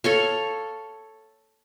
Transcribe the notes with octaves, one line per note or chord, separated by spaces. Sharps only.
A4 C#5 F5